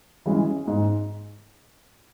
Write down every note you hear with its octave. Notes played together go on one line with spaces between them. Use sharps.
E3 G#3 C#4
G#2